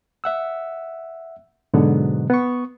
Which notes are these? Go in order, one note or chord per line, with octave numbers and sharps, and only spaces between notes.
E5 F#5 E6
G#2 B2 D3 F#3 B3
B3 C#6